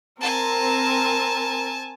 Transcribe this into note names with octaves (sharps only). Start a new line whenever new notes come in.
C4 A#4 G#5 A5